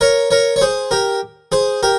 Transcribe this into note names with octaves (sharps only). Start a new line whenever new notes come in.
A#4 C#5
A#4 C#5
C#5
G#4 C5
G4 A#4
G#4 C5
G4 A#4